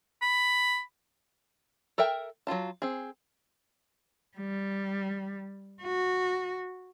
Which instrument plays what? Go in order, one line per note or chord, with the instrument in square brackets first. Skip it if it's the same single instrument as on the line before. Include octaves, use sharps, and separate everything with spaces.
[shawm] B5
[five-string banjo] A4 A#4 E5 G5
F#3 D#4 F4 A5
C4 G#4
[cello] G3
F#4